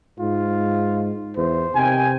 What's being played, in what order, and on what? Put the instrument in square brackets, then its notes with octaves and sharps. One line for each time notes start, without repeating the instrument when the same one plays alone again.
[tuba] G#2 [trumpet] F4
[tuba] E2 [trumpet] C5
[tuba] C3 [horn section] D#3 G5 G#5